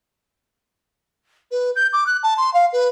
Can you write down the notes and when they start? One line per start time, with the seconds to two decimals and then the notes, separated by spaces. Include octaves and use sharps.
1.51 B4
1.76 G6
1.93 D6
2.06 F#6
2.23 A5
2.37 C6
2.54 F5
2.73 B4